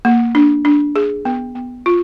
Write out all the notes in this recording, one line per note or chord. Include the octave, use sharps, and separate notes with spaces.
A#3
D4
D4
G#4
B3
B3
F4